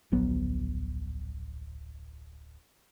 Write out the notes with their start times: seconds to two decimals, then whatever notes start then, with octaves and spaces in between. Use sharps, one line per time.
0.12 D1 A#1 F#3 B3